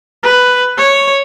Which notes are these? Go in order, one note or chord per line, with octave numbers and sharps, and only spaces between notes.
B4
C#5